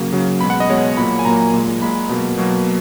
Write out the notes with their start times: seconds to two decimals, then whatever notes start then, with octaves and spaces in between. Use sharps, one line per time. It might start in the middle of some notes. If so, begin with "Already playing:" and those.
Already playing: C#3 F#3 A#3
0.12 C#3 F#3 A#3
0.41 B2 G#3 B5
0.50 F#5
0.60 D#5
0.69 B2 G#3 C#5
0.97 A#2 F#3 A#3 B5
1.19 G#5
1.25 A#2 F#3 A#3 A#5
1.54 A#2 G#3
1.82 A#2 G#3 B5
2.09 B2 F#3 A#3
2.38 B2 F#3 A#3